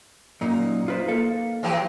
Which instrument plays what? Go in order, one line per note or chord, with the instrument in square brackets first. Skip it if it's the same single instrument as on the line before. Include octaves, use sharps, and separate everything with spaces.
[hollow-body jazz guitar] F#2 A#2 [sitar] D#4
[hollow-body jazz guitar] F4 B4 C5
A#3 A4 F5
[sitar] E3 F#3 G4